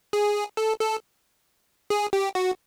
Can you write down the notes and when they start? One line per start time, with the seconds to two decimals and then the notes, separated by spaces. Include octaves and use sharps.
0.13 G#4
0.57 A4
0.80 A4
1.90 G#4
2.13 G4
2.35 F#4